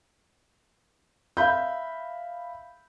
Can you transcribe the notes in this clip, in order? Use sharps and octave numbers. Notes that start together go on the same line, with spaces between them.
E5 F5 B5 G6